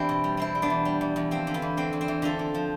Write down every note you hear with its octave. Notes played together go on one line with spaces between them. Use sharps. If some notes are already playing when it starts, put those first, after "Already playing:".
Already playing: E2 C4 D4 E4 G4
B2
G3
G3 C4 E4
G3
B3 D4
E2
G3
E2
E2
F3 C4
D3
B3
E2
D3 C4
E2
C4
E2
D3 F4 A4
D3
F3